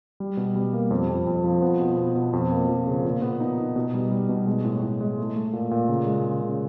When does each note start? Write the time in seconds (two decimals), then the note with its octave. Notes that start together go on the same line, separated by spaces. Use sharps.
0.20 G3
0.37 B2
0.56 G3
0.73 A#3
0.91 F2
1.09 F2
1.27 F2
1.44 F3
1.62 B3
1.80 B2
1.98 B3
2.15 B2
2.33 F2
2.51 A#3
2.69 F3
2.87 C#3
3.05 A#2
3.22 B3
3.40 D#4
3.58 D#4
3.76 B2
3.94 G3
4.11 G3
4.29 B2
4.47 G#3
4.64 A2
4.82 A2
5.00 G#3
5.18 A3
5.36 A3
5.53 A#2
5.71 A#2
5.89 C#3
6.07 G#3
6.25 C#3
6.43 C#3